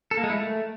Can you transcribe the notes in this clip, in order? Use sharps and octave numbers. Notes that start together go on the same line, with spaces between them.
A4
A#3
G#3
E4
A3